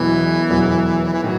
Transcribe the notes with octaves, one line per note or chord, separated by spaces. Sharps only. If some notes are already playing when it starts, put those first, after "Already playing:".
Already playing: E1 E2 B2 E3 F#3 B3
E1 E2 B2 F#3 B3
E3
A2 D#3 F#3